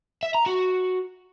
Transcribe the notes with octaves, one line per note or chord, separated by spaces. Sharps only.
E5
A#5
F#4